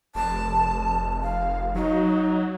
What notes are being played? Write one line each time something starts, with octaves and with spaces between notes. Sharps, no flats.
F1 A5
F5
F#3 D#4